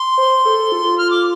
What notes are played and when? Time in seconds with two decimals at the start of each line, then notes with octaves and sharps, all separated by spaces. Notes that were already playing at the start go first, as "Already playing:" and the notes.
Already playing: C6
0.18 C5
0.45 A4
0.72 F4
0.98 F6
1.11 D6